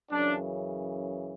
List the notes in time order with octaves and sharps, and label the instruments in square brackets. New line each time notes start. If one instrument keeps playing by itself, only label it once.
[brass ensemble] F#2 C#3 E3 D4